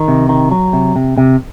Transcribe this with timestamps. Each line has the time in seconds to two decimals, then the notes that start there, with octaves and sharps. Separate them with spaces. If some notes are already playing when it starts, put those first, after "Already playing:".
Already playing: D#3
0.08 C3
0.29 D#3
0.51 F#3
0.73 C3
0.96 C3
1.18 C3